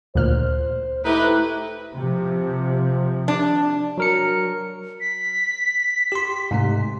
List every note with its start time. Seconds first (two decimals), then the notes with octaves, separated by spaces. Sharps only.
0.15 D2 A#2 C5 F6
1.05 A3 D#4 E4 G4 B4
1.96 C3 F3
3.28 D4
3.98 F#3 A#4 C#7
5.00 B6
6.12 G4 C6
6.51 G#2 C3 A3